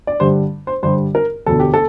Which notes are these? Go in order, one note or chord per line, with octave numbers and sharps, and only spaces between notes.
D5
G2 D3 G3 C5
C5
G2 D3 G3 C5
A#4
E1 D2 D3 A4
G4
A4